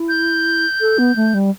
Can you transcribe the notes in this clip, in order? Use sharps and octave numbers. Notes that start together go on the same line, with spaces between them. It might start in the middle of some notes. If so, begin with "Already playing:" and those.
Already playing: E4
G6
A4
B3
A3
G3